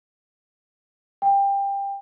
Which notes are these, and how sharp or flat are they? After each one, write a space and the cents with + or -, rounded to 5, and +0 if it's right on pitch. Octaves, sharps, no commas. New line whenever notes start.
G5 +20